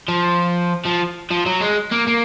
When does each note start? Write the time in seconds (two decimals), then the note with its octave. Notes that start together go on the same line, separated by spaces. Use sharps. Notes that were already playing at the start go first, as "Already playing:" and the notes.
0.08 F3
0.85 F3
1.30 F3
1.46 F#3
1.60 G#3
1.91 A#3
2.07 A#3